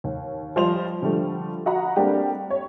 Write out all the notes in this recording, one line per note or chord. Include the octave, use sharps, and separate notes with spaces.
D#2
F3 G3 F4 C5 D#5 F7
D3 F3 G3 A3
F#4 D#5 F5 F#5 A#5 B5
G3 A3 A#3 C4 D4 G4
C#5